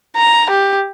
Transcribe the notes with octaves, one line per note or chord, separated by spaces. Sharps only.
A#5
G4